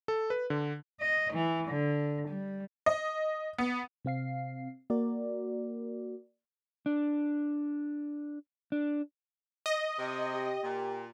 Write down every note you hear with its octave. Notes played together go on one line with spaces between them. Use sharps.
A4
B4
D3
D#5
E3
D3
G3
D#5
B3
C3 C4 F5 C7
A#3 F#4 A#4 D5
D4
D4
D#5
C3
G4
A#2